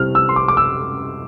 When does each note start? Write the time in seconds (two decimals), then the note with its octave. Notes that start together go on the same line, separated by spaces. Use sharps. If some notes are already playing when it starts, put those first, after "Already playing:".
Already playing: C3 G3 C4 E4 F6
0.15 E6
0.29 C6
0.36 D6
0.48 D6
0.57 E6